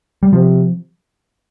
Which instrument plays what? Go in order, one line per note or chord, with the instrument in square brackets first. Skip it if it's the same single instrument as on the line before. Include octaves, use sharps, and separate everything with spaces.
[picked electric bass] G3
[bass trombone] C3 [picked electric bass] F3